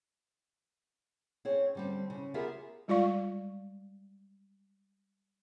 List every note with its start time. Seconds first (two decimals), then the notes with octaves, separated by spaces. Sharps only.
1.45 C4 G#4 C#5
1.75 D3 G3 C4
2.10 C#3
2.34 B3 F4 G4 G#4 A#4 E5
2.88 G3 G#3 F4 D5 F5 C#6